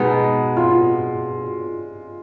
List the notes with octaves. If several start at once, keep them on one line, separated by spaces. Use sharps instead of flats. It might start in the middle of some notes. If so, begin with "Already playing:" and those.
Already playing: B2 G#3 B3 D#4
F4